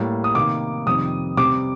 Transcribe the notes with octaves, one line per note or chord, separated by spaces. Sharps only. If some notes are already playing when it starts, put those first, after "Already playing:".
Already playing: A2 G3 A#3
D#6
C3 D#3 A#3 D6
F2 C3 D#3 G3 C4 D#6
C3 G3 C4 D6